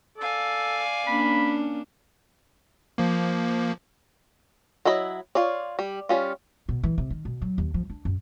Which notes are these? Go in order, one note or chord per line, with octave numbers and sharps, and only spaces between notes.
A4 D5 F5 G#5
A#3 C#4 D4 B5
F3 A#3
F#3 E4 D#5 B5
F4 C#5 D5
G3
G3 C#4 F4
B2
E3
C3
D#3
B2
F#3
D#2
F3
D4
F#2